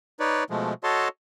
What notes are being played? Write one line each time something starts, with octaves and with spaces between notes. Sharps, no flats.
D#4 B4 C#5 D5
B2 F3 G#3 A3
F#4 A4 C#5 D#5 A5 C6